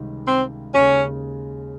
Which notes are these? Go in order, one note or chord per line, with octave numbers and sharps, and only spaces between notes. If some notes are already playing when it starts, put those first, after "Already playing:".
Already playing: C#2 C3 D#3 G3
C4
D#2 C#3 G#3 C#4